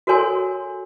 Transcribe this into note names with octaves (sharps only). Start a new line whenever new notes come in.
F#4 A4 A#4 C#5 G#5 C6